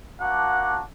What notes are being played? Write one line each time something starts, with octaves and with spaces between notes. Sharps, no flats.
A#3 D4 F#4 F#5 A5